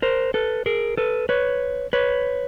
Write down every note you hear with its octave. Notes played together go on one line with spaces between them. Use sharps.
A#4 C5
A4 B4
G#4 A#4
A4 B4
B4 C#5
B4 C#5